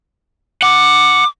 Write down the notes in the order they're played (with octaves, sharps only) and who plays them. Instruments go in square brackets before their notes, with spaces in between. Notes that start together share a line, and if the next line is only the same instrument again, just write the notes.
[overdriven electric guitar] F#5 [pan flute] D6